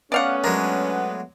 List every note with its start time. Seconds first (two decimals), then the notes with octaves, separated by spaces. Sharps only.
0.12 A3 B3 C#4 D5 F5 F#5
0.44 F#3 G#3 D4 A#4